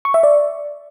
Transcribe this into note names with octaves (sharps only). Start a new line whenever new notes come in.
C#6
E5
D5